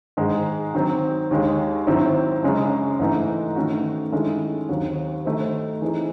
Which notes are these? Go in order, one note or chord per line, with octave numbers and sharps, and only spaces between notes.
G#2 D#3 G#3
D#3 F#3 C4
D#2 D#3 G#3
G#2 D#3 F#3 C4 E4
F#2 C#3 G#3 C#4
G#2 E3 A3 D#4
D#3 A3 C#4 F#4
D#3 G#3 C#4 E4 A4
D#2 D#3 F#3 C4 F#4
D#3 A3 D#4 F#4 C5
E3 C4 D#4 G#4